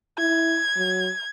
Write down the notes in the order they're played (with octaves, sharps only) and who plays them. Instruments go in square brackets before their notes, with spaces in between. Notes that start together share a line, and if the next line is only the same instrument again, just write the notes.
[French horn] E4 [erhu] G#6
[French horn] F#3